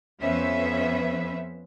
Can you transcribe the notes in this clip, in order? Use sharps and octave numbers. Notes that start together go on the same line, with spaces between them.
F2 B3 C#4 B4 C5 E5